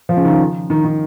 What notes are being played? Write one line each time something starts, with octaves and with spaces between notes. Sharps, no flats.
F3
C#3
D#3
D#3
D#3